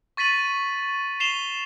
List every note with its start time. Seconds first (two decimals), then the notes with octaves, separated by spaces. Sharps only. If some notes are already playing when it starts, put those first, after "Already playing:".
0.17 C#6 A6 B6 D#7 F#7
1.20 C7 E7 F7 G7